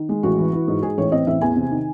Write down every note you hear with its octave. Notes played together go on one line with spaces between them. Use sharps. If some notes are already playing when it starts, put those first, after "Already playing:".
Already playing: D#3
G#3
A1 F#4
E3
E3
G#2
G#2 G#4
A1 C#5
C4 D#5
A1 E5
E2 G#5
C3
D#3